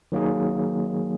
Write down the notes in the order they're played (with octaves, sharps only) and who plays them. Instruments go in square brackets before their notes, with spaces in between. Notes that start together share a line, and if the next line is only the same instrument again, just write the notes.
[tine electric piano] D#3 F#3 A#3 D#4 G#4